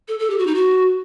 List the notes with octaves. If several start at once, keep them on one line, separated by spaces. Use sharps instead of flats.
A4
A4
G4
F#4
D#4
F#4